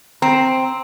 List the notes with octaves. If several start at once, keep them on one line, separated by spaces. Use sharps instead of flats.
C4 A#5